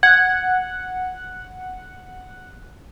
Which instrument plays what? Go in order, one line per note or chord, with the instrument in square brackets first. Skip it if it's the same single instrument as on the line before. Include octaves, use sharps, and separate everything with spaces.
[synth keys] F#5 [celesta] G#6